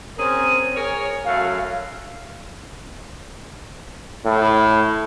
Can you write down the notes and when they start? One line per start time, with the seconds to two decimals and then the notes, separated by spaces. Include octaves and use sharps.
0.18 C4 C#4 G#4 A#4
0.76 G#4 A#4 C#5
1.26 F#2 F#3 A3 F5
4.25 A2